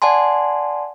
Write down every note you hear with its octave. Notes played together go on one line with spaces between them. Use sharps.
D5 F#5 G#5 A5 C6